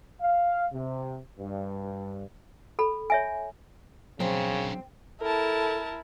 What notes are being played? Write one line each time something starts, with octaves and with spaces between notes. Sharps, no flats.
F5
C3
G2
A4 B5
C#5 E5 G#5
C#3 F#3 C4 D4 A#4
E4 A4 A#4 A5